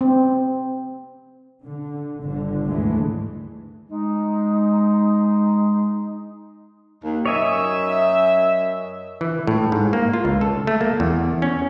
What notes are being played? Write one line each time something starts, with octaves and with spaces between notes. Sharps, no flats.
C4
D3
G1 D3
D#2 G#2 D3 E3 G#3 A3
G#3 D#4
D#2
F#2 C#5 D#5 E5 G#5
E3
A2
G#2
A#3
F4
C#2
A4
A3
A#3
E2
C#4